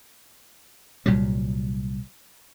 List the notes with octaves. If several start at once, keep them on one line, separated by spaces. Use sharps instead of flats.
C2 A#2 F#3 G3